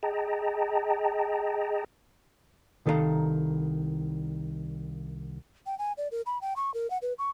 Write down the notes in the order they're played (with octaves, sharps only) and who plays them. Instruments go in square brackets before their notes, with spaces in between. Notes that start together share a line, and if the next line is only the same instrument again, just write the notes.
[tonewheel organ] G#4 D#5 G5 A5 A#5
[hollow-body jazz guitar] C2 D#3 A4 A#4 F5 A#5
[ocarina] G5
G#5
D5
A#4
B5
G5
C#6
A#4
F#5
B4
C#6